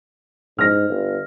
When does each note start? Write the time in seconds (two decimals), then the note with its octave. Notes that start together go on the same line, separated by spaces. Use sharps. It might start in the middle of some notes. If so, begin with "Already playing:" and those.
0.59 G#2 F6 A#6
0.90 G1